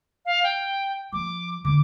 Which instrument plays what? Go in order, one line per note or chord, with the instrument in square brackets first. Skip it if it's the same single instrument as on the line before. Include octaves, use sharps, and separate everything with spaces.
[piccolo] F5
G5
[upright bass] F3 [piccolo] D6
[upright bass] D3 [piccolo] D6